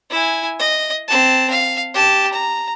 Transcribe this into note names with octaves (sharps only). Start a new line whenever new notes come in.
E4 G#5
D#5
C4 A5
F5
G4 A5
A#5